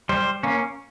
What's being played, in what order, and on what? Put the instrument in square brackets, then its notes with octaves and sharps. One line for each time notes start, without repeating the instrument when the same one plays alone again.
[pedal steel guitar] G3 C5
A#3 C#4